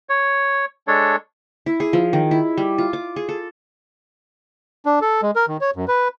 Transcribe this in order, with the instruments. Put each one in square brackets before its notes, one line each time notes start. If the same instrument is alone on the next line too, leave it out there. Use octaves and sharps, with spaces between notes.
[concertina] C#5
G#3 D4 A4 C#5
[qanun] E4
G#4
F3
D#3
E4
G3
F4
D6
G#4
A4
[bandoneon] D4
A4
G#3
A#4
D#3
C#5
F#2
B4